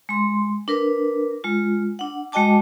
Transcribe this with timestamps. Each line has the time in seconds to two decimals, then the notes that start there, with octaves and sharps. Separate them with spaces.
0.09 G#3 C6
0.68 D4 A#4 B4
1.44 G#3 F4
1.99 D4 F#5
2.32 G#3 F#4 D#5 G5 A5 D6